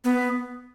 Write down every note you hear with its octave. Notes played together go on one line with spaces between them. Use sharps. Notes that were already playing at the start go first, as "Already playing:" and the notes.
B3